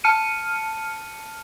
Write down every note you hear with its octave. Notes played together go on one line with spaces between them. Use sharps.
A5 F6 C#7 D#7